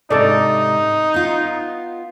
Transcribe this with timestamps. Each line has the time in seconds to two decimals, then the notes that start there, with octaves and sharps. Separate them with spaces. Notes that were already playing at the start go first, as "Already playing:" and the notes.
0.10 G#2 C3 D#4 A4 D5
1.14 B3 F4